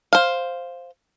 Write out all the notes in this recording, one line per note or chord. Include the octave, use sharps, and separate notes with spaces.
C5 F5